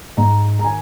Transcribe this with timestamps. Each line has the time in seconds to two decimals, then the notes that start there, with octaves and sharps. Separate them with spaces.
0.17 G#2 A#5
0.59 A#5
0.64 D#3 G#5